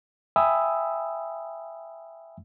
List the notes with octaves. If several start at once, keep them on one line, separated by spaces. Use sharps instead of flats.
E5 G5 G#5 B5 D#6 E6